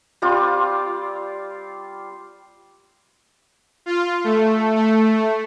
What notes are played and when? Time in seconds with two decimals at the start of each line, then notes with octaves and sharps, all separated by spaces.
0.22 G3 C4 F4 D5
3.86 F4
4.24 A3
4.76 A3